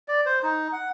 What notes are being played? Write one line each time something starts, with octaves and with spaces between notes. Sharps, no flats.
D5
C5
D#4
F#5